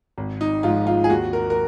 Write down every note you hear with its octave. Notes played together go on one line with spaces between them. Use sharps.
G#1
D#4
G#2 F3 F4
F4
G#4
D#2 F#4
A#4
A#4